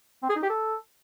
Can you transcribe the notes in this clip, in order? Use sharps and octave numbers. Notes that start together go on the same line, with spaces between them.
C4
G#4
D#4
G4
A4